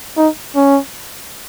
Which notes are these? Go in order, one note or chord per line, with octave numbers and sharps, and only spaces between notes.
D#4
C#4